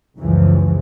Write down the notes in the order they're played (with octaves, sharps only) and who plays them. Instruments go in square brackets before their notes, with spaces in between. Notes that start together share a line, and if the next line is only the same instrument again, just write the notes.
[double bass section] C#2 F#2 E3 F3